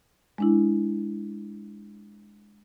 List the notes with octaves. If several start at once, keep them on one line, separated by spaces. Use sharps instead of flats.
G#3 D4 E4